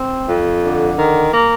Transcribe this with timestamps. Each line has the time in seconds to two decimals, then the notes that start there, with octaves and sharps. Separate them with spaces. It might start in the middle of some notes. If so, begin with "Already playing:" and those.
Already playing: C4
0.25 F2
0.61 D3
0.97 D#3
1.33 A#3